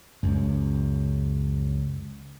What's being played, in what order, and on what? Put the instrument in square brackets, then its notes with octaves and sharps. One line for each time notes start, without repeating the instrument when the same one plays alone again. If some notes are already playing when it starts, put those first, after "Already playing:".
[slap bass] C#2 F#2